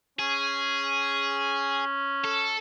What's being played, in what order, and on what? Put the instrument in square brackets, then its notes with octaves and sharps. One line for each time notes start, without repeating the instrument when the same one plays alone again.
[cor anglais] C#4 [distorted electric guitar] G#4
[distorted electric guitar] A4